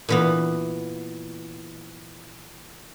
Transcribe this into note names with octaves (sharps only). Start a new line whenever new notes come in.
A#2 E3 B3